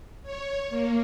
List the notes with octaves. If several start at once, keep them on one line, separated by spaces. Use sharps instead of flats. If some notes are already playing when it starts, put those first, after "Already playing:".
C#5
A#3